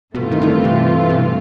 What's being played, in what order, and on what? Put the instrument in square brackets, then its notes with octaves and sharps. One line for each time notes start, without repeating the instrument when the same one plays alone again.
[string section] G2 E3 A3 C4 F4 [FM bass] B2
[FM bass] D#3
D#3
D3
C3
C3
B2